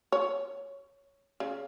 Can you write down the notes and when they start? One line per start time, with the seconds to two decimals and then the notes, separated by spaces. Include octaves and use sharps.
0.12 C#5
1.40 C#3